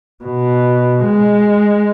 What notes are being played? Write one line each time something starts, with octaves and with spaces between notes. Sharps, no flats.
B2
G#3